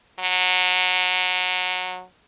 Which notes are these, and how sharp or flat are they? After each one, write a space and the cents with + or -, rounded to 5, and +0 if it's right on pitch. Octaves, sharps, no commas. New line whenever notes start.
F#3 -20